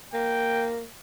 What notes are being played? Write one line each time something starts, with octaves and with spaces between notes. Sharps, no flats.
A#3 G5